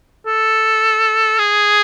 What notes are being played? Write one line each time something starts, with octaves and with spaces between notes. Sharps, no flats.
A4
G#4